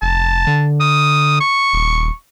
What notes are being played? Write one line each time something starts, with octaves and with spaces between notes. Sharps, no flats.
F1 A5
D3
D#6
C#6
D#1